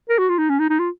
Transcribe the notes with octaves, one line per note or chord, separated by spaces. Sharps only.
A#4
F#4
F4
D#4
C#4
D#4
D#4
F4